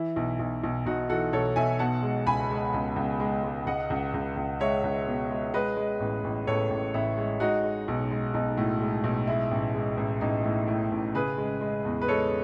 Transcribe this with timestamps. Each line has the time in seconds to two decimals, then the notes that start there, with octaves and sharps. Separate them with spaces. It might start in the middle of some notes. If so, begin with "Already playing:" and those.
Already playing: E3 E4
0.16 B1
0.39 B1
0.63 B1
0.86 B1 D#4 F#4
1.09 E3 F#4 A4
1.33 B1 A4 C#5
1.56 B1 E5 G#5
1.79 B2 F#5 A5
2.03 G#3
2.26 C#2 G#5 B5
2.50 G#3
2.74 C#2
2.96 C#2
3.20 G#3
3.44 G#3
3.67 C#2 D#5 F#5
3.90 C#2
4.14 C#2
4.37 C#2
4.60 G#3 C#5 E5
4.84 C#2
5.07 B2
5.30 G#3
5.54 G#3 B4 D#5
5.77 G#3
6.00 A1
6.24 A1
6.47 A1 A4 C#5
6.70 A1
6.94 A1 E4
7.17 G#3
7.40 G#3 D#4 F#4
7.64 G#3
7.88 B1
8.11 G#3
8.34 B1 D#4
8.58 A2
8.81 G#3
9.04 B1
9.27 G#3 E4
9.51 A1
9.74 G#3
9.97 A1
10.21 A1 D#4
10.44 A2
10.68 A2
10.92 A1
11.15 C#3 G#4 B4
11.38 G#3
11.61 G#3
11.85 E2
12.02 B4
12.08 G#3 A4 C#5